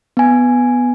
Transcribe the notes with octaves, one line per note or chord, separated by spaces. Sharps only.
B3 G#5